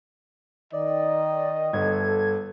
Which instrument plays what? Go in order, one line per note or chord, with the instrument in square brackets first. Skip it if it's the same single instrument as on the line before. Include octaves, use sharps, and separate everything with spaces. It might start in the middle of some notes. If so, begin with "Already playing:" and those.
[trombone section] D#3 [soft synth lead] D5 [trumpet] D#5
[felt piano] G1 [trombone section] A4 [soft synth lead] G#6